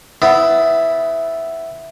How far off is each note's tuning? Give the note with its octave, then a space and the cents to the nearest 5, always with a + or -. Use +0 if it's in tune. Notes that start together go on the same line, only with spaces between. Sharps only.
B3 +25 E4 +0